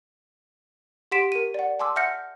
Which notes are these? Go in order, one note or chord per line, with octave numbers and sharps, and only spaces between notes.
G4 F#5 C6 B6 D7 E7
A#4 D#7
D5 F#5
G#5 A5 C6 D6 E6
E5 F#5 F6 G6 A#6 C#7